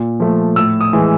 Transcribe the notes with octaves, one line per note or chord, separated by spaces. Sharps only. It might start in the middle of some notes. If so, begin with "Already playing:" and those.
Already playing: A#2
F3 A3
A2 E6
D#6
E3 G#3